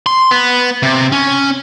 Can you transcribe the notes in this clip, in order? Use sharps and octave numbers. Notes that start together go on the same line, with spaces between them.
C6
B3
C3
C#4